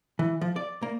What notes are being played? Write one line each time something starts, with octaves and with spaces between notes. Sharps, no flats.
E3
F3
D5
A#3